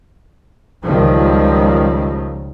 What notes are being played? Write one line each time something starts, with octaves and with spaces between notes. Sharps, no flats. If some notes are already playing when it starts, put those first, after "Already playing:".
C#2 D#3 F3 G3